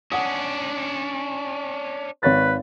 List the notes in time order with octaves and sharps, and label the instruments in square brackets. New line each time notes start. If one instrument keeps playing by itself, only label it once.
[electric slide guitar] C#4 D4 [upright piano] F#5 D#6
[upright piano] G#1 C#5 A6 [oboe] B4